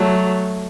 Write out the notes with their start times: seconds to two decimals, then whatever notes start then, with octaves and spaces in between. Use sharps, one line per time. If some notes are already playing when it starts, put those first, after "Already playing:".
Already playing: F#3 A3